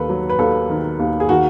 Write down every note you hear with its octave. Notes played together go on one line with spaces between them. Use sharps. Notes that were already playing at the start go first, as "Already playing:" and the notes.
Already playing: D#2 D#3 A4 B4
F#3
B4
D#2 A4
D#3
D#2
G#4
D#3 F#4